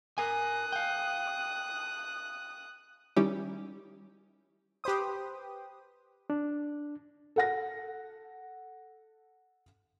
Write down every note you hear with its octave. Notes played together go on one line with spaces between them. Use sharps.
A#4 G#5 D#6 F#6
F5 G5
D#3 G3 C#4 D#4 E4 G4
G4 B4 C5 D#6
D4
A4 F#5 A#6